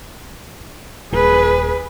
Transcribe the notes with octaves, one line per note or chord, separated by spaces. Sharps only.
D#1 G#4 B4